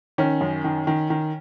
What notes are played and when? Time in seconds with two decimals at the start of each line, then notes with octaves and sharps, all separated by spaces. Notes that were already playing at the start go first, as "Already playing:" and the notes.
0.18 D#3 C#4
0.41 F#2
0.64 D#3
0.87 D#3
1.10 D#3